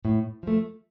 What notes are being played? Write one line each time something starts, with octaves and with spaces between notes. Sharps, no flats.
A2
F3 A3